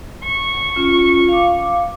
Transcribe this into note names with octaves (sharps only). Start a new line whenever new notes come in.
C#6
C#4 F4
F5 D6